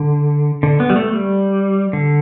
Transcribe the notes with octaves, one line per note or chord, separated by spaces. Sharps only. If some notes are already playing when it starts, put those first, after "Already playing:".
Already playing: D3
D3
B3
G3
A3
G3
D3